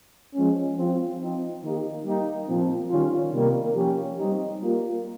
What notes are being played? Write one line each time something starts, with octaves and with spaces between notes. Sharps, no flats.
F3 G#3 C#4
F3 C4 F4
F3 C4 D#4
D#3 A#3 D#4 G4
G3 A#3 D#4 G4
A#2 F3 C4
D#3 G3 C#4 F4
C3 D#3 G3 A#3
F3 A#3 C#4 G4
G3 C4 D#4 G4
G3 A#3 F4